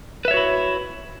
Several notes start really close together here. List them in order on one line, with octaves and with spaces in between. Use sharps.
B4 E5 C#5 F#4 E4